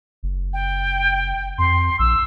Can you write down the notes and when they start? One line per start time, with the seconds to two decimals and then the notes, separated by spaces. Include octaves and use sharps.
0.23 F#1
0.53 G5
1.58 F2 C6
1.99 A#1 E6